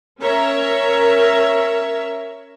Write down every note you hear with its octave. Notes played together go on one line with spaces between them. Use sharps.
C#4 A#4 C#5 E5 A#5